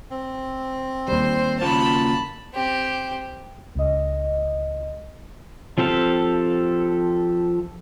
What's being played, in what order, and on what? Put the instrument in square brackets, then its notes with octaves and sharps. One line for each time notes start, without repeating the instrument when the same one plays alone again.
[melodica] C4
[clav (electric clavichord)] D#2 G3 [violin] C5
[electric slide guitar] C#3 A#3 F4 [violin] A5 B5
[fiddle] C4 G4
[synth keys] C#2 D#5
[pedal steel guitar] F3 C4 G4 A4 F5